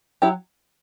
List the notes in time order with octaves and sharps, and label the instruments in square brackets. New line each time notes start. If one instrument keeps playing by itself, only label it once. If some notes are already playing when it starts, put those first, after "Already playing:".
[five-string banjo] F#3 E4 G4